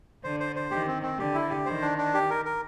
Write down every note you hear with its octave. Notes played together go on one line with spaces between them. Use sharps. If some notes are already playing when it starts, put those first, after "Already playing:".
D3 C5
C5
C5
D#3 G4
C4
C4
D3 G4
E4
G4
D#3 C5
D4
D4
G4
A#4
A#4